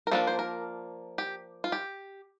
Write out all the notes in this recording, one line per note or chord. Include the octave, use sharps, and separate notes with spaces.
A#4
F3 A#3 D4 A4
C5
A#4
G4
F4
G4